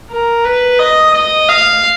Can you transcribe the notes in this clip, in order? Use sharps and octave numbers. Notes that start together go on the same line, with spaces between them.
A#4
B4
D#5
D#5
F5